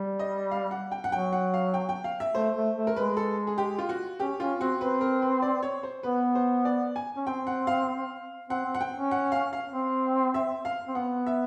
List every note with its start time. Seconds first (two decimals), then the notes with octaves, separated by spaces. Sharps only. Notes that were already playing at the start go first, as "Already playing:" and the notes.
Already playing: G3
0.19 D#5
0.51 F5
0.71 F#5
0.92 G5
1.04 F#5
1.12 F#3 G5
1.33 F#5
1.54 F5
1.74 G5
1.89 G5
2.04 F5
2.20 E5
2.35 A3 C5
2.56 A3
2.76 A3
2.87 A#4
2.96 G#3 B4
3.17 A4
3.47 G#4
3.58 G4
3.78 F4
3.89 F#4
4.20 C#4 G4
4.40 C#4 F4
4.60 C4 F#4
4.81 C4 B4
5.01 A#4
5.22 B4
5.42 D5
5.63 C#5
5.83 C5
6.03 B3 B4
6.35 C5
6.65 D5
6.96 G#5
7.17 C#4
7.27 C4 G5
7.47 F#5
7.67 F5
8.50 C4 F#5
8.65 C4
8.75 F#5
8.81 G5
8.96 C#4
9.11 F#5
9.32 F5
9.53 F5
9.72 C4
10.34 E5
10.65 F5
10.88 C4
10.95 B3 F#5
11.27 E5